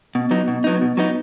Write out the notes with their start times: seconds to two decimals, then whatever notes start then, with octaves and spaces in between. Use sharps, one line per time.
0.15 B2
0.31 F#3 B3 D#4
0.48 B2
0.64 F#3 B3 D#4
0.81 B2
0.97 F#3 B3 D#4